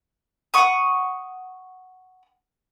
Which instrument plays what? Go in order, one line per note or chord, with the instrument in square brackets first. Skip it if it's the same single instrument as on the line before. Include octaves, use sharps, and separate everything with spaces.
[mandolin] F#5 C#6 D#6